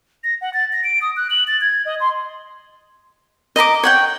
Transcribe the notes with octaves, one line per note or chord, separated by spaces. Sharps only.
A#6
F#5
A6
A#6
D7
D#6
F#6
F#7
A6
G#6
D#5
C6
D#5 A#5 B5 D6
C#5 F#5 G5